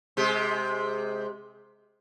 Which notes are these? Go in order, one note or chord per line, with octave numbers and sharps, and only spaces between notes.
C3 G#3 G4